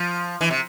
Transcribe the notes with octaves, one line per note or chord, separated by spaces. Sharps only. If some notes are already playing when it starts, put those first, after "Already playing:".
Already playing: F3
E3
C3